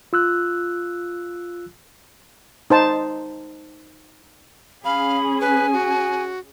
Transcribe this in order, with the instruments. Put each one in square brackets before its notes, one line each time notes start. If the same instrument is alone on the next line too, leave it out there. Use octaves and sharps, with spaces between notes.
[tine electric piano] F4 E6 F#6
[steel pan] D#4 C5 A5
[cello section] C#4 G#4 [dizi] F5 [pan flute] B5
[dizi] B4 [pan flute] G#5
[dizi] F#4